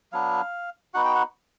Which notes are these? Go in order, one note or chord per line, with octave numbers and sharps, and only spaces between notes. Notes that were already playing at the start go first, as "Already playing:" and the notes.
F#3 B3 D4 F5
B3 D#4 F#4 F#5
G5
F#5